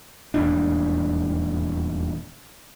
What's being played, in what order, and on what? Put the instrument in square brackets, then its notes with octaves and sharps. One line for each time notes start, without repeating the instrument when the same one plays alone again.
[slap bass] D#1 E2 G#2 D4